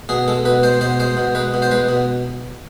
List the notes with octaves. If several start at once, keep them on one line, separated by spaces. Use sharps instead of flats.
B2 G#4
G#3 A4
B2 B4
G#3 C5
B2 C5
G#3 C5
B2
G#3 B4
B2
C5
G#3 B4
B2